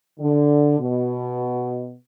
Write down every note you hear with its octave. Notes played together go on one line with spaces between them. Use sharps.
D3
B2